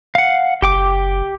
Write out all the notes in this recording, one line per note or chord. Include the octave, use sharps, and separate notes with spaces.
F5 F#5
F#1 G4 G5 D6